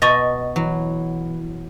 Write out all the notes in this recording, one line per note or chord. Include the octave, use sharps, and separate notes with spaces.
B2 D#5 A#5 C#6 A6 A#6
E3 F#3